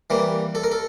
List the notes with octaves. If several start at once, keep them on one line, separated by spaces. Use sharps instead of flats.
E3 G3 A#3
A4
A#4
A4